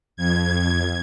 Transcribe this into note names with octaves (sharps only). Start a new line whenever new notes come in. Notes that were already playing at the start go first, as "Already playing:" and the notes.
F2 G#6